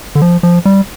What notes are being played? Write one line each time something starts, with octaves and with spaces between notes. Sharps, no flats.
D3
F3
F3
G3